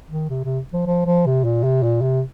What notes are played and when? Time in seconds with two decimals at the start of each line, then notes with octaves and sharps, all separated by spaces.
0.10 D#3
0.30 C3
0.44 C3
0.73 F3
0.87 F3
1.06 F3
1.26 C3
1.45 A#2
1.64 C3
1.83 A#2
2.02 C3